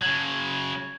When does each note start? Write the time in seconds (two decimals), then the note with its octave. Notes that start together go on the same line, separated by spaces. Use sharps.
0.02 C#3 F#3 G#6